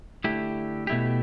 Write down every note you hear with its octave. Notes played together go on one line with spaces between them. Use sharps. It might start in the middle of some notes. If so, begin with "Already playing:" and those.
D3 A3 E4 G4
B2 A3 E4 G4